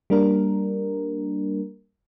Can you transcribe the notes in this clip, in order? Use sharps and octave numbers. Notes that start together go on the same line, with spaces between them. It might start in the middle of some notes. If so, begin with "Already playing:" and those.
G3 A#3 D4 A#4